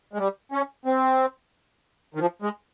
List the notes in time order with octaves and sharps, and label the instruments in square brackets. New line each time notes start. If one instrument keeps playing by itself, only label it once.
[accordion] G#3
G3
C#4
C4
D#3
F3
G#3